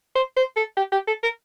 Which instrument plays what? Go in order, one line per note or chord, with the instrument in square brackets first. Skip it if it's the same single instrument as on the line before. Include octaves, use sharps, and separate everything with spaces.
[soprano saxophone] C5
C5
A4
G4
G4
A4
A#4